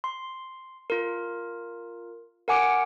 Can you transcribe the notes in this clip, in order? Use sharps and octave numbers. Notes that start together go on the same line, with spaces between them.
C6
F4 A#4
A#4 F#5 G#5 D6 C#7 D7